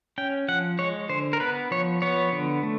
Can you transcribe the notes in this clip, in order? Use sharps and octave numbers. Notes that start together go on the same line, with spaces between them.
C#4 G5
F3 F#5
G#3 C#5
D3 C5
A#4
B3 B4
F3 C#5
B3 C#5
D3
A3